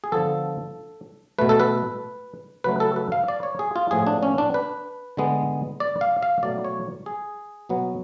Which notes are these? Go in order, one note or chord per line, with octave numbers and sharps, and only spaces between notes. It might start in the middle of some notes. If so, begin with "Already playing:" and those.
G#4
D3 F3 B3 A4
B2 A3 B4
A4
B4
C#3 F#3 A3 B4
A4
B4
F5
D5
C#5
G#4
F4
A2 F3 B3 G#4
D4
C#4
D4
B4
D3 G#3 B3
D5
F5
F5
B2 F#3 A3 D5
C#5
G#4
B2 F#3 B3